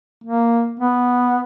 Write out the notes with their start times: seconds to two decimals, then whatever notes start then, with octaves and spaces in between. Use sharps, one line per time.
0.24 A#3
0.79 B3